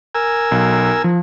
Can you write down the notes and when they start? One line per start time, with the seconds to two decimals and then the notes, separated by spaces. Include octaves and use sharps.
0.15 A#4 G#5 E6
0.51 B1
1.04 F3